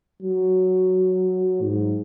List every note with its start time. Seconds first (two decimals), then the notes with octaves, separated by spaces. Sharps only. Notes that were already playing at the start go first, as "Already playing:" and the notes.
0.23 F#3
1.62 G#2